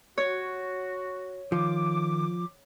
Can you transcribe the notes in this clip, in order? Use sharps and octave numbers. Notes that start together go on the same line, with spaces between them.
F#4 C#5
D#3 F3 D6